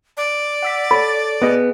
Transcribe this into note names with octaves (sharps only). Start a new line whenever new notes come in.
D5
F#5 E6 B6
A4 C#5 B5 A6
B3 G#4 D#5